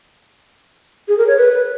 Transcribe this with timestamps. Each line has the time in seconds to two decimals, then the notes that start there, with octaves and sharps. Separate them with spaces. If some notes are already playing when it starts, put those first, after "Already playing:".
1.08 G#4
1.18 A#4
1.27 C#5
1.37 B4